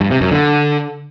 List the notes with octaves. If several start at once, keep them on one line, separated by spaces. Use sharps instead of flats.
G2
C3
F#2
D3